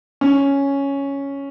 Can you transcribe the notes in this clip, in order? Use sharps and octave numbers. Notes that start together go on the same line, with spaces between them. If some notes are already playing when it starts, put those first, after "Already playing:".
C#4